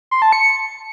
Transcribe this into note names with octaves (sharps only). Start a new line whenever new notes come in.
C6
A5
C#7